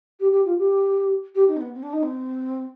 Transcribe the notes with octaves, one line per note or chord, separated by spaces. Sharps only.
G4
G4
F4
G4
G4
D#4
C4
B3
C4
D4
D#4
C4